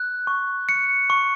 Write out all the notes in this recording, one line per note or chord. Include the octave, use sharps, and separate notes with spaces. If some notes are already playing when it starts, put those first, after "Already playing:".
Already playing: F#6
C#6
C#7
C#6